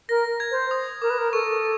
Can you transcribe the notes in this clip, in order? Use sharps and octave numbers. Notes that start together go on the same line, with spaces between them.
A#4 A#6
G#6
C5
D#6
A#4 D6
B4
A#4
A4 C#6